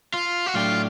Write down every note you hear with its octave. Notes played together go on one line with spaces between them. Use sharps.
F4
F#4
A2 F#3 A3 D4 F4 G4